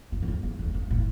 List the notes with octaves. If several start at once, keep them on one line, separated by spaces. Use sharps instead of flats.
G2
F#2
F2
E2
F2
G2
A2